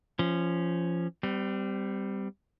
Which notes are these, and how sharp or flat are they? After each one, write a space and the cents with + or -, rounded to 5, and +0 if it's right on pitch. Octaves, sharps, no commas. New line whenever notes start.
F3 -20 C#4 +0
G3 +0 C4 -35